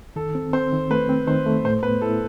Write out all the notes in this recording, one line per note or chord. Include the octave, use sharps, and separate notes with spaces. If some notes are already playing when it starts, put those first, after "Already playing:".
D#3 A4
C4
C4 C5
D#3
A3 B4
C4
D#3 C5
A3
A2 C5
B3 B4
E4 A4